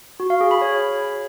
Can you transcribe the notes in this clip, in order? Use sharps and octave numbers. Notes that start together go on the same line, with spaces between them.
F#4
F5
G#4
B5
C#5